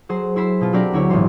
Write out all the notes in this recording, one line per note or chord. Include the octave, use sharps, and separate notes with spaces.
F#3 G#4 C5
E4 C5 B5 E6 C7
B2 F4
F#3 C4 D4 G4 A#4 D5
D2 E4 C#5
G#1 A#2 E3 C6